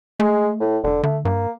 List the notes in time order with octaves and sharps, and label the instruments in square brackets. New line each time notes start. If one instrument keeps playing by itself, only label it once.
[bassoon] G#3 [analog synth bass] A3
[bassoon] A2
[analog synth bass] F1 [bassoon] D3
[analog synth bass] D3 [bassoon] A3
[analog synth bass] G2 [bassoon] A#3